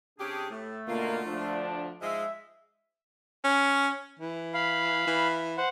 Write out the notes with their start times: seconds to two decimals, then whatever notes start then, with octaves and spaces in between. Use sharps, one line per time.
0.19 C3 C#4 D4 G4 G#4
0.50 A2 A3
0.88 B2 D3 A#3 F4
1.26 D2 F3 D4
2.01 G#2 F3 G#3 E5
3.44 C#4
4.19 E3
4.54 F5 B5
5.07 E3
5.58 C5 F#5